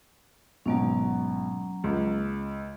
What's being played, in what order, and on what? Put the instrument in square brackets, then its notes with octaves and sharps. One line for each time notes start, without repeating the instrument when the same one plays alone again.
[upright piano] G#1 B2 [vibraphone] F#3 A#3 C#4
[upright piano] C#2